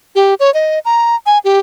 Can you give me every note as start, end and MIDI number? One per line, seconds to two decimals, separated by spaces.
0.15 0.34 67
0.40 0.52 73
0.54 0.79 75
0.85 1.16 82
1.26 1.39 80
1.44 1.59 67